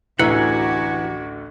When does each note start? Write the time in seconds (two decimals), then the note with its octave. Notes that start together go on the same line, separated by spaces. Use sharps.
0.19 A1 D2 E3 F#4 G4 F#5 G#5 A#5